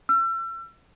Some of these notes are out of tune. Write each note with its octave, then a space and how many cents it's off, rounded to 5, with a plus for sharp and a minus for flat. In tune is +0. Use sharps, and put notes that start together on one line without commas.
E6 +35